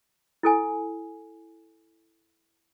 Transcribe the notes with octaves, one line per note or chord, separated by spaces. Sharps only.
E4 A4 G#5